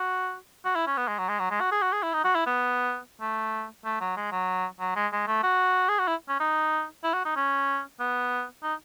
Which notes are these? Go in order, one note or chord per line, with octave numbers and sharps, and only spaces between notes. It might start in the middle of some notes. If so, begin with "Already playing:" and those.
Already playing: F#4
F#4
E4
C#4
B3
G#3
F#3
G#3
F#3
G#3
F#4
G#4
F#4
G#4
E4
D#4
F#4
E4
B3
A3
A3
F#3
G#3
F#3
F#3
G#3
G#3
A3
F#4
G#4
F#4
E4
C#4
D#4
E4
F#4
D#4
C#4
B3
D#4